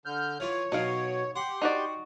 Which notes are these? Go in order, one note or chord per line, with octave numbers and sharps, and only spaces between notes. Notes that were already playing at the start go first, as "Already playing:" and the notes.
D3 F6 G6
E3 F4 C#5
B2 F#3 D#4 F5
G4 F#5 C6
D#4 F#4 D5